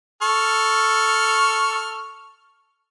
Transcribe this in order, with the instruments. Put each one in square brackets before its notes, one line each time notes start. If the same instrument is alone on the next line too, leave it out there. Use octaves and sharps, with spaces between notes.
[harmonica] A4 C#6 F6